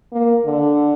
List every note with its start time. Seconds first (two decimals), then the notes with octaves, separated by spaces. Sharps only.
0.12 A#3
0.46 D3